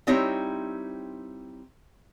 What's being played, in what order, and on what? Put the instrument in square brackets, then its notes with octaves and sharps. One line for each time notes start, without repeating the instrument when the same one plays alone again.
[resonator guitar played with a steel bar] G3 C4 D#4 E4 C#5